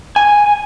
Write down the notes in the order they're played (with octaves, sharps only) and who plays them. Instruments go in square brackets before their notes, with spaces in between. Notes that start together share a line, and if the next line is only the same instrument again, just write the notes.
[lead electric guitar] G#5